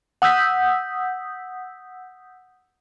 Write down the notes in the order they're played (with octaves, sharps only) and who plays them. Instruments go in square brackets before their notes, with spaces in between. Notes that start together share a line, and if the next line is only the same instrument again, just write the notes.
[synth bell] F#5 D#6 E6 G6 B6